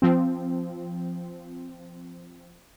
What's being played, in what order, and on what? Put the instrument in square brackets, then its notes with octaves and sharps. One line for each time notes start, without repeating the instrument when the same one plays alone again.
[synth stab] F3 C4